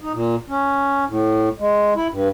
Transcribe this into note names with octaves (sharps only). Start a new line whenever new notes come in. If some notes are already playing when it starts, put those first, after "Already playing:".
D#4
A#2
C#4
A2
G#3
E4
G2